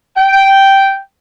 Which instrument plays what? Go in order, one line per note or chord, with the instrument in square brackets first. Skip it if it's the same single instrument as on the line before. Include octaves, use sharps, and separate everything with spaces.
[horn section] G5